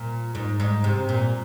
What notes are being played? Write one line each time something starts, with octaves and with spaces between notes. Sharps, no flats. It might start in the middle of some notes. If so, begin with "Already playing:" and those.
Already playing: A#2
G#2
G#2
C3
A#2